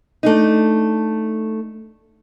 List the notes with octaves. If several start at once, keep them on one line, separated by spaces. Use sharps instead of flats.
A3 D4 D#4